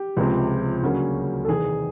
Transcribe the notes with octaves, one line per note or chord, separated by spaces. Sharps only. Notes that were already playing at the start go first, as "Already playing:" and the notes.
Already playing: G4
C#2 C3 F3 G#3 C4
D2 C#3 F#3 A#3 C#4
A4
E2 C3 D#3 G#4